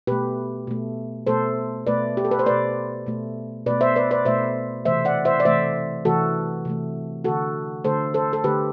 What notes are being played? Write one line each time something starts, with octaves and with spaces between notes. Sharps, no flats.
B2 A3 G4 B4
B2 A3
B2 A3 A4 C5
B2 A3 B4 D5
G4
A4
B4
C5
B2 A3 B4 D5
B2 A3
B2 A3 B4 D5
C5 E5
B4 D5
B4 D5
B2 A3 C5 E5
C3 E3 A3 C5 E5
D5 F#5
C5 E5
D5
C3 E3 A3 C5 E5
C3 E3 A3 F#4 A4
C3 E3 A3
D3 A3 F#4 A4
D3 A3 A4 C5
A4 C5
A4
D3 A3 G4 B4